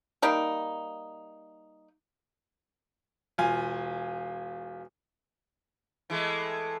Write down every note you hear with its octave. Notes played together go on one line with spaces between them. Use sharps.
G3 A#3 D#4
E1 F4 G#5
E3 G#3 A3